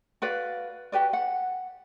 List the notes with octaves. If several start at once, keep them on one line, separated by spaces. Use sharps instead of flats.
F#4 B4 D5 F5
F#4 G4 B4 D5
F#5